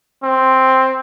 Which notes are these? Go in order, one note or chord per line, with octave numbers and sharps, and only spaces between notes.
C4